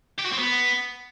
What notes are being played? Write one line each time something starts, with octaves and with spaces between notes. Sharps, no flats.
G4
F#4
C4
B3